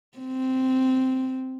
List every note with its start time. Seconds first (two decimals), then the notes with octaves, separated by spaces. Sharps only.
0.18 C4